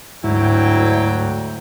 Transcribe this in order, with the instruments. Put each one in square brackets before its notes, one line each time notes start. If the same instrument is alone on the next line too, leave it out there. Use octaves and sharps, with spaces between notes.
[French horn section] D2 [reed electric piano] G#2 [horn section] F#3 G5 [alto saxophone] E4